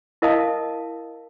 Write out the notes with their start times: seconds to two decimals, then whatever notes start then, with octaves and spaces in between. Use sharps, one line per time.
0.22 E4 A#4 D#5 F5 A5 D#6